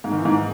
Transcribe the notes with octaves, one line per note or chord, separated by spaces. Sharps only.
G#2
D#3
E3
G#2